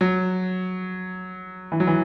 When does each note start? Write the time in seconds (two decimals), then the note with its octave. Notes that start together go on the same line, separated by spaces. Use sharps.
0.01 F#3
1.72 E3
1.80 F#3
1.87 E3